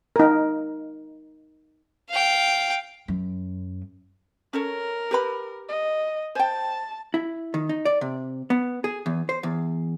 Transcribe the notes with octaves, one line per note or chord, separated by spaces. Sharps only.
D#4 A#4
F5 G5
F#2
C#4 A4 A#4 C#5
G4 B4 B5
D#5
C5 G5 A5
E4
D#3
D#4
D5
C3
B3
G#4
E2
C5
E2